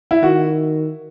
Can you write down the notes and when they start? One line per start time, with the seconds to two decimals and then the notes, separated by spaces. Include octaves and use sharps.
0.11 E4
0.23 D#3 F#4